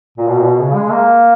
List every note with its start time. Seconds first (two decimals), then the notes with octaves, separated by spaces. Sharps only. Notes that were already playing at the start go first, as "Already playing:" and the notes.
0.18 A#2
0.28 B2
0.39 A#2
0.43 B2
0.59 C#3
0.74 G#3
0.91 A#3